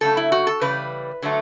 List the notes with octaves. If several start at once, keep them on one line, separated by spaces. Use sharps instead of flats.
C#3 F#3 A3 A4
E4
F#4
A4
C#3 E3 G3 B4
D3 F#3 A3